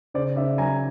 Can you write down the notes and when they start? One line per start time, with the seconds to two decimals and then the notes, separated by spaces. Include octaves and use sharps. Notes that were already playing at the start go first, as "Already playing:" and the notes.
0.14 C#3 C5 D5
0.36 C#3 D5 E5
0.58 F#3 G#5 A#5